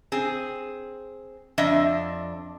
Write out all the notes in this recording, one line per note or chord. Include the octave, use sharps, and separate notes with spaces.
C4 G#4
F2 D4 D#5 E5